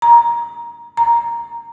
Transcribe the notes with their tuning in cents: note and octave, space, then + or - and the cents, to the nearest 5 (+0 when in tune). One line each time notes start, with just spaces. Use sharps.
A#5 +20
A#5 +0